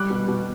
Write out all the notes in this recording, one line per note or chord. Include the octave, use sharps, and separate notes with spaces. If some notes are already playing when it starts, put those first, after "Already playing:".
Already playing: G3 D6 F#6
B2
B2